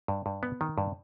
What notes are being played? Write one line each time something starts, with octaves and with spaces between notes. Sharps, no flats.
G2
G2
B3
D#3
G2